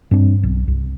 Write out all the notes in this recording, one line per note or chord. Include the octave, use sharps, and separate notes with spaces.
G2 C4 D4
B1
C2